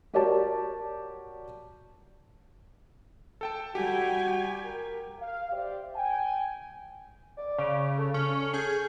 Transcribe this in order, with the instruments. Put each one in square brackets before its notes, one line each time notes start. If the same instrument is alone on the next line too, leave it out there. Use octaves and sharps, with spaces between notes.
[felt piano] F#4 G4 A#4 C#5 D5 A5
[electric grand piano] A4 G5 A5
[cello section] G3 [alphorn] F#4 [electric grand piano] G4 [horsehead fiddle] G5 G#5
[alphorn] A#4
[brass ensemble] F5
G4 C5 D5 E5 G5
G5 G#5
[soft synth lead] D5
[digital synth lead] C#3
[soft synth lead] A4
[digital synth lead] C#4
[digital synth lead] G#4 [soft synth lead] G6